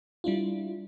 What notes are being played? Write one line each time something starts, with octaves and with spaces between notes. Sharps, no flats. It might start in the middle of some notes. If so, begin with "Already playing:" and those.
G3 D4 E4 F4